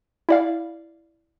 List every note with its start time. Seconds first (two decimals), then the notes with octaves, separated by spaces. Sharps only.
0.29 E4 D5 F5